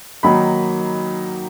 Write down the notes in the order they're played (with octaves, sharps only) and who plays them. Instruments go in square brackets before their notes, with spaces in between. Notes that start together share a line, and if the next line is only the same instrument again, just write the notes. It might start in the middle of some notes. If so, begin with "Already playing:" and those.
[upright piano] D#3 F#3 A#3 D#4 B5